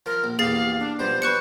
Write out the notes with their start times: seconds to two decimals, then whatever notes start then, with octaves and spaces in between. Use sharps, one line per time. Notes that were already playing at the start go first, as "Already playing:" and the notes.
0.06 F3 A#4
0.24 A#1
0.39 A#1 E2 G4 G#4 F5 A6 C7
0.79 D4
0.99 B2 F3 G3 C5
1.22 D4 B4 C#6 F#6 C#7